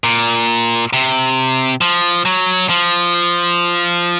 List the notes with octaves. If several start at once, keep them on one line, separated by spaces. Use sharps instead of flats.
A#2
C3
F3
F#3
F3